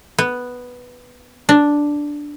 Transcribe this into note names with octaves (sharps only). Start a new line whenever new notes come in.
B3
D4